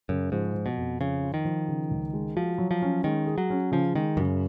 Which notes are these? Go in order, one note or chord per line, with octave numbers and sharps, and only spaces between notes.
F#2 C#3
G#2 F3
F3
B2
F2
C#3 F3
F4
D#3
F3
C#3
C#2
G#3
F3 F#4
F#3
F3
C#4
D#3 G#3
G#4
F#3
C#4
C#3 F3
D#3 G#3
F#2 C#3